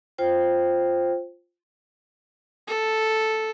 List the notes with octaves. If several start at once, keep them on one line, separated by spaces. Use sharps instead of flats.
F4 C5 G5
A4